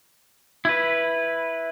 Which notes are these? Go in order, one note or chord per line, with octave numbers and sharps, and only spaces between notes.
E4 B4